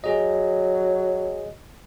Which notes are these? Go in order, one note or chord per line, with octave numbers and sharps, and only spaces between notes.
F#3 G#4 D#5